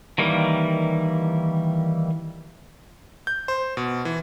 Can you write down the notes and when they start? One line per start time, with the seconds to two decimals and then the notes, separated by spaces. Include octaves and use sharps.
0.18 D#3 E3 G3 A#3
3.27 G6
3.48 C5
3.77 B2
4.05 E3